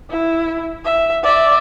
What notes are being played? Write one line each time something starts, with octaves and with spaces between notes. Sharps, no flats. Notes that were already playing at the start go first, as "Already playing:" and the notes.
E4
E5
D5 E5